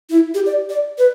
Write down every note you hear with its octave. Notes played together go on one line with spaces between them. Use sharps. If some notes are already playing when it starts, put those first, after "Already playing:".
E4
G4
D5
D5
B4